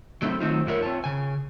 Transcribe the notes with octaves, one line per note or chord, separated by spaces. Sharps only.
F#3 G#3 A3 B3 C4 E4
D#3 F#3 A3 C4 D#4 F4
F2 F3 F#3 E4 A#4 C#5
C4 F4 C#5 A5
C#3 G#5